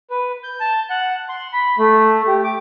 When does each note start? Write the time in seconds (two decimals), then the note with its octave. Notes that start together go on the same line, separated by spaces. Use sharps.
0.10 B4
0.43 G6
0.60 A5
0.90 F#5
1.29 C6
1.53 B5
1.78 A3
2.27 G4
2.44 D6